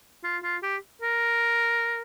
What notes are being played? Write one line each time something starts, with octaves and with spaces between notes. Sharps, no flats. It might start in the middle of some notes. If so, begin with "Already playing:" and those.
F4
F4
G4
A#4